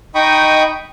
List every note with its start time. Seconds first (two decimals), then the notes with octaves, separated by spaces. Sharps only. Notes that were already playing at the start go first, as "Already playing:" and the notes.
0.15 D#4 D#5 G5 B5 C#6 D#6